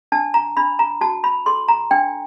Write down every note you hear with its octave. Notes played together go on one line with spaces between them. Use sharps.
D4 A5
A#5
D4 B5
A#5
F#4 A5
B5
A4 C6
A#5
D4 G5